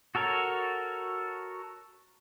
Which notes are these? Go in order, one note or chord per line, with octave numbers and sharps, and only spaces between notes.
F#4 A4 A#4 C#5